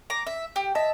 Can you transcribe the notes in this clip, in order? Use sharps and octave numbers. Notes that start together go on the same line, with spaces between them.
A#5 D6
E5
G4
D#5 E5 A5